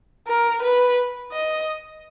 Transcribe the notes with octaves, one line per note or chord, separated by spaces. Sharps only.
A#4
B4
D#5